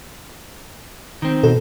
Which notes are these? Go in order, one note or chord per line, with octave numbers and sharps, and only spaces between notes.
D#3 C4
B2 A4